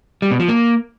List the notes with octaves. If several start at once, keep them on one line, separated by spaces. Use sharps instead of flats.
G3
B2
F3
A#3